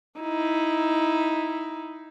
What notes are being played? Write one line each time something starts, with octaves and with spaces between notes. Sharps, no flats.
D#4 E4